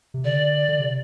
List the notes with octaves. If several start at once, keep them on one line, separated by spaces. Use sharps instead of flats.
C3
D3 D5
D3
C3